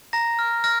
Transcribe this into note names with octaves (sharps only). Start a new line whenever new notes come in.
A#5 A#6
F6
F6 A#6